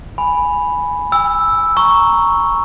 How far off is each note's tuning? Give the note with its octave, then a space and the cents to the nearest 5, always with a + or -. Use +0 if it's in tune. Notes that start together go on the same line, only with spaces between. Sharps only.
G#5 +0 B5 +0
G#5 -40 E6 +0
A#5 +0 C#6 +0 E6 +0